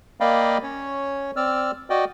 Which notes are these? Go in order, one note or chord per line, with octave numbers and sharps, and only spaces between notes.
A#3 D5 D#5 F5 G5 B5
C#4 C#5
C4 D5 E6 F6
F#4 D5 D#5 G5